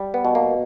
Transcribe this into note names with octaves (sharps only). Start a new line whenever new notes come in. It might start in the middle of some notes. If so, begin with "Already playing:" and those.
Already playing: G3
B3
B2
A#3